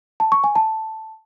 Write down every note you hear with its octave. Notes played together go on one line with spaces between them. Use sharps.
A5
C#6
G#5
A5